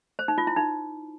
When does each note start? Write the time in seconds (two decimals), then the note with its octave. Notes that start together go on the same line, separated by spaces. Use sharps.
0.19 C5
0.28 D#4
0.38 F4
0.47 E4
0.57 D#4